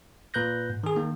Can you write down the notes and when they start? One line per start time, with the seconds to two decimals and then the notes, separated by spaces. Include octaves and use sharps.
0.34 A#2 B4 F#6 G6 A#6
0.70 G#2
0.84 D#3 G#4
0.96 D#3 A#3